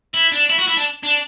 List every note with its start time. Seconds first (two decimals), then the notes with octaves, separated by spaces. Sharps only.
0.14 E4
0.32 D4
0.49 E4
0.58 F#4
0.67 E4
0.77 D4
1.03 D4